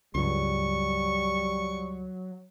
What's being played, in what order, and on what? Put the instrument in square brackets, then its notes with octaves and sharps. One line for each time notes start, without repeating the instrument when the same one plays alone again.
[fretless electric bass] C#2 G2 [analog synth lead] F#3 [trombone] G3 [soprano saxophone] C#6